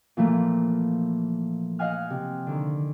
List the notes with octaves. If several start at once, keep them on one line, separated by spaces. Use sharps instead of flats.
A#2 E3 F3 A3 A#3
D#5 F5 F#5 G#5 F6
C3
D3 D#3